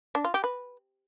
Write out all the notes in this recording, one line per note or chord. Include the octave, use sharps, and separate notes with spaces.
D4
F4
G4
B4